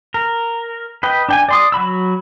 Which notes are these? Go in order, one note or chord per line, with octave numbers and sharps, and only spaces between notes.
A#4
B4 D#5 G5
D4 G5 G#5
D5 C6 D#6
F#3 F#4 B5 E6